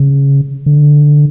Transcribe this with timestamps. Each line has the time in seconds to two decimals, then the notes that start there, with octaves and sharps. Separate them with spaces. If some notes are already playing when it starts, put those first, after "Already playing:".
Already playing: C#3
0.66 D3